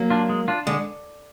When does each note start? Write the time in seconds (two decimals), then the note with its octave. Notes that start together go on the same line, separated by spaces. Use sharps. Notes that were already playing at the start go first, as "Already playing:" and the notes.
Already playing: F#3 A#3
0.10 D4 F4
0.29 G#3
0.48 D4 F4
0.67 D3 G#3